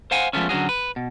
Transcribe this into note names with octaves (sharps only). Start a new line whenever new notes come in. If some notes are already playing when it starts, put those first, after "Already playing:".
C5 F5 F#5 G#5
F3 F#3 G#3 A3 B3 C#4
D3 F#3 B3 C#4 F#4 G#4
B4
B2